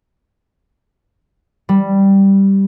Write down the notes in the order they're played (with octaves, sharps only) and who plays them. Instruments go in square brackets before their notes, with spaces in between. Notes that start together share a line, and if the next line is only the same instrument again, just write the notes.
[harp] G3